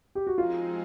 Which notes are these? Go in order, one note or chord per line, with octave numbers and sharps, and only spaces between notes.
G4
F#4
F3 G#3 C4 D#4 F4 G#4